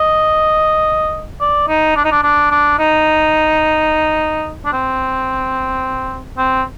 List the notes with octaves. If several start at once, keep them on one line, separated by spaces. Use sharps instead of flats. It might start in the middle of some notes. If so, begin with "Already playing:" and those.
Already playing: D#5
D5
D#4
D4
D#4
D4
D4
D4
D#4
D4
C4
C4